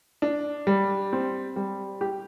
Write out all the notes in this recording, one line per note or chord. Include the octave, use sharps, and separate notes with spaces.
D4
G3
C4
G3
G4